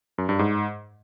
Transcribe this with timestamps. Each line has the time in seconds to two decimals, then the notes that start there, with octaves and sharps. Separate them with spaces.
0.18 F#2
0.29 G2
0.39 G#2